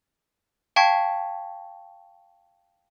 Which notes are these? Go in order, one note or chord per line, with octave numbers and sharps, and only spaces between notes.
F5 G5 A5 C#6 G#6 B6